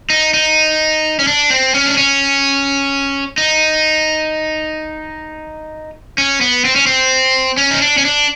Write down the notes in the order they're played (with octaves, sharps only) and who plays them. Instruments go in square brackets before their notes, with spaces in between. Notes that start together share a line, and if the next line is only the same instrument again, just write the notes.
[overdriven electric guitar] D#4
D#4
C#4
D4
C4
C#4
D4
C#4
D#4
C#4
B3
C4
C#4
C4
C#4
D#4
D4
C#4
D4